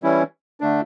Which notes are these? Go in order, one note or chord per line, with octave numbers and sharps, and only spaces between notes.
E3 G3 C#4 E4
D3 A3 D4